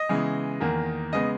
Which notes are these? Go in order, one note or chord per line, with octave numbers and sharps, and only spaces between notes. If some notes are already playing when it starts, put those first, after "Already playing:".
Already playing: D#5
C#3 E3 G#3 B3
E2 D#3 A#3
C#3 G#3 B3 D#5